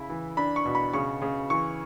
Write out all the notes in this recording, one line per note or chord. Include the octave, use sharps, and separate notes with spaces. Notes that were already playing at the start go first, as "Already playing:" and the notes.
Already playing: C#3 E4 B5
E3
D4 B5
C#6
B2
B5
C#3 C#6
C#3
E3 C#6